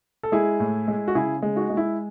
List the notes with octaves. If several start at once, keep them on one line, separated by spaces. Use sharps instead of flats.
A4
G#3 E4 G#4
A2
G#3
F#4
C#3 E4 G#4
G#3
D#4 F#4
G#3
E4